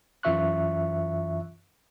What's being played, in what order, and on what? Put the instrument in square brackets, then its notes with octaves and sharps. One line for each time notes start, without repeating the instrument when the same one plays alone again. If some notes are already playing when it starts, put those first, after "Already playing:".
[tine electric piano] F#2 E3 F4 E5 C#6 F#6